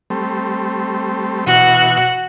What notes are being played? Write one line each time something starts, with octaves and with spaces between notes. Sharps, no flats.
G3 A3 C4
B2 E3 F#4